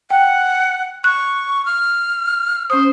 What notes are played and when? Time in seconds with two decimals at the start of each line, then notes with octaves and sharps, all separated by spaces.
0.10 F#5 G5
1.04 C#6 F#6
1.66 F6
2.70 C#4 C5 D#6